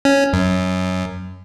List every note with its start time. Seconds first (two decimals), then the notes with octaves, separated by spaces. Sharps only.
0.05 C#4
0.33 F#2